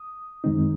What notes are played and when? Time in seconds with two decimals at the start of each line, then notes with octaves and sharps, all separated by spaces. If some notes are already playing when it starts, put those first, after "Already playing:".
Already playing: D#6
0.44 F#2 D#3 G#3 C4 D#4